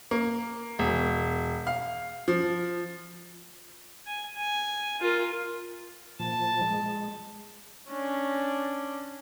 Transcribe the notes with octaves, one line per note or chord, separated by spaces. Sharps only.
A#3
E1
F5
F3
G#5
G#5
F4 A#4
A#2 F3 A5
G#3
C#4 D4